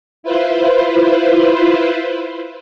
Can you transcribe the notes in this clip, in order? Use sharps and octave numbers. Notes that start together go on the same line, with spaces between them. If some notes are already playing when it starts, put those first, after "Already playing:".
E4 F4 B4 C5